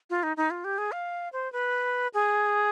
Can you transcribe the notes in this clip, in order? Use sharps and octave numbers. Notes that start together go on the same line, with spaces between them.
F4
D#4
D#4
F4
G4
G#4
F5
C5
B4
G#4